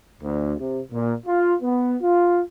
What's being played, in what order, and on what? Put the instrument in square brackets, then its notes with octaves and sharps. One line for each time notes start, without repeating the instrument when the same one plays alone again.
[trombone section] D2
C3
A#2
F4
B3
F4